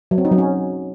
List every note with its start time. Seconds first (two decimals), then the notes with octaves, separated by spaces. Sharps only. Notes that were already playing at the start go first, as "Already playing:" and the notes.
0.11 F#3
0.18 C4
0.25 D#4
0.31 F#3
0.38 C#4